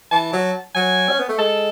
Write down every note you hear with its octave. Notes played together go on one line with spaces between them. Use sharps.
E3 A5
F#3
F#3 G#5
C#4
B3
A3
G#3 A4